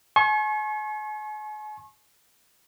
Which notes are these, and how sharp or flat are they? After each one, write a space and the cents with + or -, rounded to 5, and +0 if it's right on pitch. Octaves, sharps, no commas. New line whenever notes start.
G#5 +40 C#6 -35